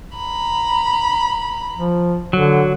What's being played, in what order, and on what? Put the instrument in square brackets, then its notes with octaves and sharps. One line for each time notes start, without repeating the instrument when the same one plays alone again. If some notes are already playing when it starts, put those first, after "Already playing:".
[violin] A#5 B5
[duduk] F3
[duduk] D3 [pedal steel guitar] F#3